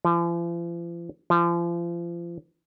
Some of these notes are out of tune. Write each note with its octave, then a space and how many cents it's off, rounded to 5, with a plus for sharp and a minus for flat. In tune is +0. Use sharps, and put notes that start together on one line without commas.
F3 -45
F3 -35